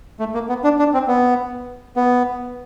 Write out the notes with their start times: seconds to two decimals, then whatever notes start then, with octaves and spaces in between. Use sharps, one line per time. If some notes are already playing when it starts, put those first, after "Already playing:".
0.19 A3
0.34 A#3
0.49 B3
0.64 D4
0.79 D4
0.94 C4
1.08 B3
1.96 B3